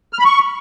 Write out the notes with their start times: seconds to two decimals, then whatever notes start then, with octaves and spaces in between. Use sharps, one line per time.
0.13 F6
0.19 B5
0.25 C#6